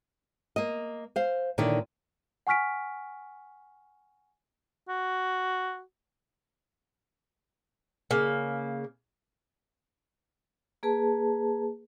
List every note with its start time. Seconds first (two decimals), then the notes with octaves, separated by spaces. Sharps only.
0.56 A#3 D#5
1.16 C5 F5
1.58 A#2 D3 D#3 E4 C#5 D5
2.47 F#5 G#5 C#6 F6 B6 D7
4.89 F#4
8.11 C#3 A#3
10.83 A#3 G#4 B4 A5